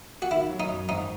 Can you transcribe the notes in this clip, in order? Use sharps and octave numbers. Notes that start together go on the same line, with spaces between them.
F#4
D#3 E4
F#3
D#4
F#2
G#1 D#4